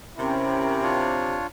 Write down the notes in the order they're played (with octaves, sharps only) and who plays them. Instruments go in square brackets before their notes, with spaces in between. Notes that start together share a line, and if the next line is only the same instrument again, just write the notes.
[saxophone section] C3 [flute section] C#4 A#4 G5 [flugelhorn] E4
[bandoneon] D4 F4 C#5